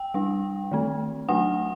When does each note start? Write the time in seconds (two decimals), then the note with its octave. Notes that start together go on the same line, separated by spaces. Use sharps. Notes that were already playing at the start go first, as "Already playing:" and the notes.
Already playing: G5
0.14 G3 D4
0.72 D#3 A3 C4
1.29 F#3 A3 D4 F#5